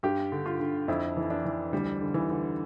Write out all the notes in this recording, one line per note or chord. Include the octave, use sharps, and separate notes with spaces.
G2 G4
D3
F4
D3
F2 E4
E3
D4
E3
D2 G3
D3
E3
D3